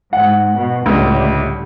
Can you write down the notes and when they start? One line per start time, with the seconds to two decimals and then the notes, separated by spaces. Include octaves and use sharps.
0.13 G#2 F#5
0.56 B2
0.86 C#2 A2 D3 G3